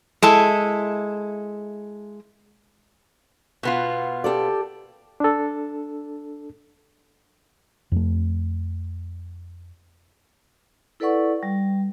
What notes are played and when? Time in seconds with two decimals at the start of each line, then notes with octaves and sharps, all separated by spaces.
0.22 G#3 E4 A4
3.63 B2 B3 F4
4.24 G4 A4 D5
5.20 D4 A4
7.92 F2 A3
11.00 E4 A4 B4 D5 F#5 C#6
11.43 G3